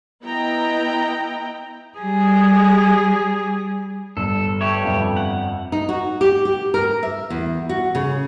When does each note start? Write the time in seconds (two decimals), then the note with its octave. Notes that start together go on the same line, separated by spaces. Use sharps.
0.23 B3 E4 D#5 G5 A#5
1.99 G3 G#4
4.17 G1 A4
4.61 A3 G4 B4 C#5
4.83 G1 F2 F5
5.17 F#5
5.72 D#4
5.89 F#4
6.21 G4
6.45 G4
6.74 A#4
7.03 E5
7.30 E2
7.69 F#4
7.95 C#3